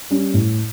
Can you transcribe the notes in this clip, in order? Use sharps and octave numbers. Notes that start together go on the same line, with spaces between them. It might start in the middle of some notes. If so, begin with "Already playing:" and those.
G3 C#4
A2